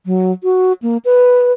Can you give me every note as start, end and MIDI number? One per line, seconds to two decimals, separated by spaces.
0.06 0.32 54
0.44 0.73 66
0.82 0.97 58
1.05 1.52 71